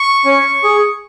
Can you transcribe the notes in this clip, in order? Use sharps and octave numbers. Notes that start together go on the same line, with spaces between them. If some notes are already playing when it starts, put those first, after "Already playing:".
Already playing: C#6
C#4
G#4